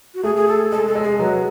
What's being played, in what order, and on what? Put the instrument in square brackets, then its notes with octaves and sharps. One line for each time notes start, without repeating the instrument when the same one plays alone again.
[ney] F#4
[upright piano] A3 [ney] G#4
[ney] G#4
A4
[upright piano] G#3 [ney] A4
[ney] A4
[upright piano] G#3
[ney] G#4
[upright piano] F#3 [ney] B4